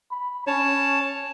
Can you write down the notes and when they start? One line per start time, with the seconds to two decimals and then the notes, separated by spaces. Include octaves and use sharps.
0.11 B5
0.47 C#4 C#5 A5